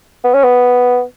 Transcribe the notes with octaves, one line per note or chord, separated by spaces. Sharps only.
B3
C#4
B3